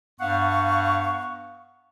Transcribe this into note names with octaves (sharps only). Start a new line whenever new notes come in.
G2 B3 F5 F#5 C#6